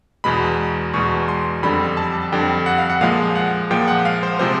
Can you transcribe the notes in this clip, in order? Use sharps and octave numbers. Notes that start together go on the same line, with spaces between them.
E2 B2 G#3 B5
E2 B2 G#3 C#6
C6
F2 D3 G3 B5
A5
F2 D3 G3 G5
F#5
F5
F#5
A#2 F3 G#3 F5
F#5
A#2 F3 G#3 G5
F#5
F5
C5
C3 F3 G#3 C5